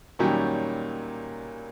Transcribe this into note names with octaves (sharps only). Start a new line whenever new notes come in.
A#2 D#3 F#3 G3 C#4 G4